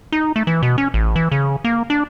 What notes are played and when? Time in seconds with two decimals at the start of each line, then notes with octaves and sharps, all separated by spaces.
0.12 D#4
0.36 A3
0.47 E3
0.62 B2
0.78 C#4
0.94 A1
1.16 E3
1.32 C#3
1.64 A#3
1.90 D4